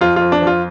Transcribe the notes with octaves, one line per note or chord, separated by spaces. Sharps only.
F2 F4
F4
F2
D4
F3
F4